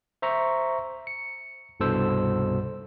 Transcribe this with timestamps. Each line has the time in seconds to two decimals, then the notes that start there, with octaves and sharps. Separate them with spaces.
0.22 C5 E5 A#5 C#6
1.07 C#7
1.80 C2 G2 B2 A4 C5 E6